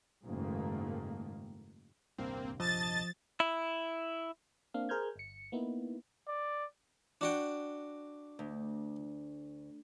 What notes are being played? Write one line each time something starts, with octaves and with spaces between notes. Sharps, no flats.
F#1 G#2 D#3 A3 A#3
D#1 C2 G2 A#3 C4
F3 D#5 A5 A6
E4
A#3 C4 D4 F5
G#4 A#4 C5 F6 G6 G#6
G1 C#7
A#3 B3 D#4 E4
D5
D4 F#4 G5
D2